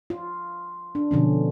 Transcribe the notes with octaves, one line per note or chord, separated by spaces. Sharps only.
F4
D4
B2 D3 F3 C#4